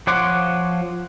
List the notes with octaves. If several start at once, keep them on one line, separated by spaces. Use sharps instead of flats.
F3 C#5 F#5 C6 D6